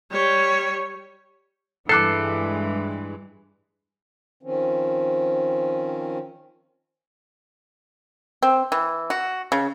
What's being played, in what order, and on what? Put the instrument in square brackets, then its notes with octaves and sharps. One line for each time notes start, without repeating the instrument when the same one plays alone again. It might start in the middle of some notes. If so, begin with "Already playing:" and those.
[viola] G3 C#5
[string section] G2 E3 G#3 [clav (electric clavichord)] A4 [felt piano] D6 F#6 C7
[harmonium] D#3 F3 C4 C#4
[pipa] C4
E3
F#4
C#3